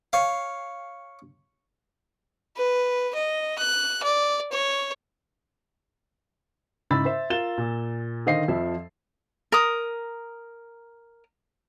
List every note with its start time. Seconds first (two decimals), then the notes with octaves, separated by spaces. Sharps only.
0.13 C#5 F5
2.57 B4
3.15 D#5
3.59 F#6
4.03 D5
4.52 C#5
6.91 G#2 C#3 E4 B5 E6 A6
7.05 C5 E5
7.30 F4 A#4 A6 E7 G7
7.58 A#2
8.26 D3 D#3 C5 D#5 F5 C7
8.48 F2 F3 E5
9.52 A#4 D#6